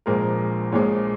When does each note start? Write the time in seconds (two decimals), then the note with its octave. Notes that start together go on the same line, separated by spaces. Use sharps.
0.06 A#1 A#2 F3 G#3 A#4
0.72 A#1 A#2 F3 G#3 C#5